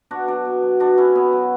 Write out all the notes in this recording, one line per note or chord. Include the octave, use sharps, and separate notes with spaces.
B2 D4 F#4
F#3 D4 F#4
B2
F#3
B2 D4 F#4
F#3 C#4 E4
B2 B3
F#3